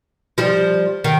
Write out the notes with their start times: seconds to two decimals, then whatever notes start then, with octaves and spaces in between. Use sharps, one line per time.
0.38 F3 G3
1.04 D#3